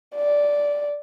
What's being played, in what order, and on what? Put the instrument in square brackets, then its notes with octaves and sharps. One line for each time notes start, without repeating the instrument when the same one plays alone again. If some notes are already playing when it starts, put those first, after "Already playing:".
[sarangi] D5